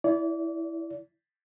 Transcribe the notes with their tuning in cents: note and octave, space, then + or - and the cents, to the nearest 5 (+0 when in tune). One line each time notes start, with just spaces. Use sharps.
E4 +0 D5 -30